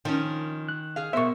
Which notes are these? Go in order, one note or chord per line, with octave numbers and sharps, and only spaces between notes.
D#3 F3 C#4
F#6
G#4 F5
B2 B3 A#4 C5 E5 C#6